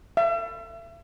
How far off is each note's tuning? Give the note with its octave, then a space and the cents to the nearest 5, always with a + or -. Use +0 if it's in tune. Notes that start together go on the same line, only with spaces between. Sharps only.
E5 +40